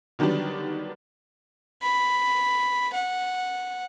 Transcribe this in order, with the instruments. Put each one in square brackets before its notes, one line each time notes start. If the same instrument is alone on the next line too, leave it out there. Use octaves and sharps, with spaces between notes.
[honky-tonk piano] D3 D#3 F#3 G3 B3 D4
[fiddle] B5
F#5